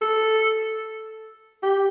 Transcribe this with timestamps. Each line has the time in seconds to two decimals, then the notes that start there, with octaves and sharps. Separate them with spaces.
0.01 A4
1.63 G4